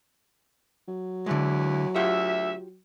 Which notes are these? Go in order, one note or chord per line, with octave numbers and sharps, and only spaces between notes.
F#3
D#2 D3 E3 G#3 E4
D2 F4 G4 E5 F#5